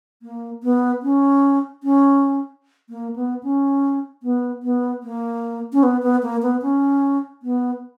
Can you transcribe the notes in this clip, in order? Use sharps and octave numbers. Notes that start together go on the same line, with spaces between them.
A#3
B3
C#4
C#4
A#3
B3
C#4
B3
B3
A#3
C#4
B3
B3
A#3
B3
C#4
B3